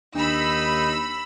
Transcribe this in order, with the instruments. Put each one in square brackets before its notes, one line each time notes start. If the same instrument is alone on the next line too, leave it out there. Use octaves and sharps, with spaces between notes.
[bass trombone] D#2 [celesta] D4 [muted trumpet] D#4 [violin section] B5 E6